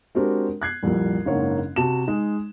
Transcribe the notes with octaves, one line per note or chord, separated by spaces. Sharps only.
G#3 C4 D4 F#4 G4 A#4
F#6 G#6 C7
C2 F2 A#2 G3
F#1 G#2 A#3 D4 C#5 F#5
C3 F#4 A5 E7
G#3 D#4